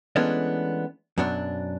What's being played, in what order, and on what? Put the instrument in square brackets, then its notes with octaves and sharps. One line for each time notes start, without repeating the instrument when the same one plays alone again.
[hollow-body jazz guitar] E3 G#3 A3 B3 C#4 D4
F#2 B2 F#3 D4